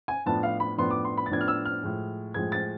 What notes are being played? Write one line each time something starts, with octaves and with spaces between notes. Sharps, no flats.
G#5
A2 F3 B3 D4 A5
F5
B5
A2 F3 B3 D4 C6
D6
C6
B5
A6
A2 F3 B3 D4 G#6
F6
E6
F6
A2 F3 G#3
A2 F3 G#3 G#6
A6